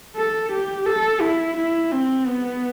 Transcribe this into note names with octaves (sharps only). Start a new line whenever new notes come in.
A4
G4
A4
E4
E4
C4
B3